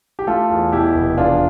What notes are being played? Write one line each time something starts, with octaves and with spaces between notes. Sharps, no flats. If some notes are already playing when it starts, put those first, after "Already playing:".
G4
A3 F4 A4
E2
B2 E4 G4
F1
E2 D4 F4